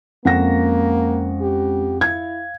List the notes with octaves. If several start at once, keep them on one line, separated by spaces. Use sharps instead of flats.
F2 G#3 A#3 C#4 F#5 A#6
G4
E4 F5 G#6